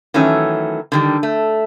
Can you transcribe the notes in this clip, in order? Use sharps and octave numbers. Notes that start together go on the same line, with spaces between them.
D#3 E3 F#3 A3 C#4
D3 D#3 G3
A3